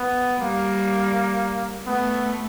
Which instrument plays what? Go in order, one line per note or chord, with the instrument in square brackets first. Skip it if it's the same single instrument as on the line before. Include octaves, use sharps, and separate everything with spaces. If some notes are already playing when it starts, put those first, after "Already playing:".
Already playing: [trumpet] B3
[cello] G3 [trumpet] A#3
[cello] A3 [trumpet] B3